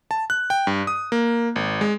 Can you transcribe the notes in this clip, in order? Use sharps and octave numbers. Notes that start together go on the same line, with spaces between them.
A5
F#6
G5
G2
D#6
A#3
G#1
G#3